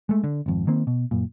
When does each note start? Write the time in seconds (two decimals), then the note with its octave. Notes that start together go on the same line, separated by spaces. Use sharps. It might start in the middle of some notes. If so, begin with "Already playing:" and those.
0.09 G#3 A3
0.24 D3
0.46 G#1 F2
0.67 D#3 A#3 C4
0.87 B2
1.11 F#2 A#2